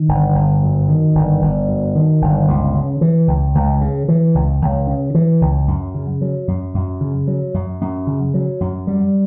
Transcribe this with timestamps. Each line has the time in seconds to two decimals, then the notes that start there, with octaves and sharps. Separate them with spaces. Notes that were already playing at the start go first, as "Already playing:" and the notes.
Already playing: D#3
0.09 G1
0.35 G1
0.62 F#2
0.88 D#3
1.15 G1
1.42 G1
1.68 F#2
1.95 D#3
2.22 G1
2.48 C#2
2.75 C#3
3.01 E3
3.28 C#2
3.55 C#2
3.81 C#3
4.08 E3
4.35 C#2
4.62 C#2
4.87 C#3
5.14 E3
5.41 C#2
5.68 F#2
5.94 C#3
6.21 F#3
6.48 F#2
6.74 F#2
7.01 C#3
7.27 F#3
7.54 F#2
7.81 F#2
8.07 C#3
8.34 F#3
8.61 F#2
8.87 G3